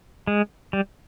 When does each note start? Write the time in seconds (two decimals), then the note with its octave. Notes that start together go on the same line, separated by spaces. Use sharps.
0.27 G#3
0.73 G3